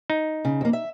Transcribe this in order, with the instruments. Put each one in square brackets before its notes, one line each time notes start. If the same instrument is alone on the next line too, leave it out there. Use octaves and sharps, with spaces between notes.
[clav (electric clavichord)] D#4
[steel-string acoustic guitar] C#3
F2 A#3
E5